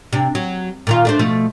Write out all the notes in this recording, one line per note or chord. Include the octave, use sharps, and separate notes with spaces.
C3 D4
F#3
A#2 D#3 F4
A3 D4 C5
B2 F3 A3